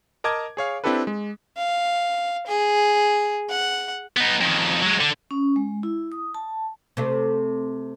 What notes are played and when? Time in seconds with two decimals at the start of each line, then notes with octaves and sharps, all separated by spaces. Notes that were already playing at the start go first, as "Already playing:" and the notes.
0.24 A#4 D#5 A5 D6 G#6
0.57 G#4 C#5 F5
0.84 C4 D4 E4 G4 A4 B4
1.07 G#3
1.57 F5
2.47 G#4
3.49 F#5
4.17 B3 D#4
4.41 F2 D#3
4.82 F#3 G#3
5.00 D3
5.31 C#4
5.56 G#3
5.83 E4
6.12 D#6
6.35 A5
6.97 C3 A3